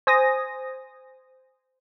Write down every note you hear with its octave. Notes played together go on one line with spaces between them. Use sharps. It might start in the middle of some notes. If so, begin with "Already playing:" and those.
C5 G#5 D#6 A#6